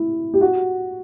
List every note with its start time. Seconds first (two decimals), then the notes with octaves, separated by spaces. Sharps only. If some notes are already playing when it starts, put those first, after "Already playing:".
Already playing: E4
0.34 G4
0.41 F#4